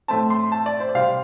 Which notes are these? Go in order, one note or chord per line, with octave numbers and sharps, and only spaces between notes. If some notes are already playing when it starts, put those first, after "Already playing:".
A2 A3 C4 A5
C6
A5
D5
C5
D5
C3 G3 C4 F5